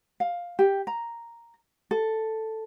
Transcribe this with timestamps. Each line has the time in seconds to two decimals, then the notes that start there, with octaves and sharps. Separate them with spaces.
0.20 F5
0.59 G4
0.87 A#5
1.91 A4